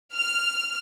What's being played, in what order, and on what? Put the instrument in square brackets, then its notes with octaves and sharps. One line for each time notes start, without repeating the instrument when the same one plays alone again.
[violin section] F6